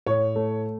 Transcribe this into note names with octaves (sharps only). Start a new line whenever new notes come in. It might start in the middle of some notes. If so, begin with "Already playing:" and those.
A2 C#5
A3